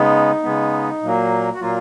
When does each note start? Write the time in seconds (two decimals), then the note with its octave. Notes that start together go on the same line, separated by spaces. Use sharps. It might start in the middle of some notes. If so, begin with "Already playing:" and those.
Already playing: C#3 G#3 B3 D#4
0.43 C#3 G#3 B3
1.02 A#2 F#3 A#3
1.55 F#4
1.61 A#2 F#3 A#3 F4